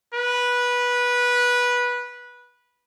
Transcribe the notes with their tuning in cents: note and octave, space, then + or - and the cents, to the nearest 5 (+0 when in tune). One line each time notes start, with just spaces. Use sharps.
B4 -15